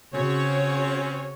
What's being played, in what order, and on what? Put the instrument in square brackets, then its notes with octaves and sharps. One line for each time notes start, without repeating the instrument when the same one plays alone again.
[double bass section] C#3 [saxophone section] C4 C#4 [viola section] F#4 C#5